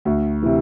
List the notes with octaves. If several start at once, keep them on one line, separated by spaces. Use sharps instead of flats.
D2
C3 E3